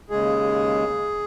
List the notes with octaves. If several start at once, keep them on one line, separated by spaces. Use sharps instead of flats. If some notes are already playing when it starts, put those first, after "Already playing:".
D#2 C#3 G#3 G#4